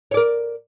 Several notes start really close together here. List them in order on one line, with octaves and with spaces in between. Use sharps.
C#5 D5 A#4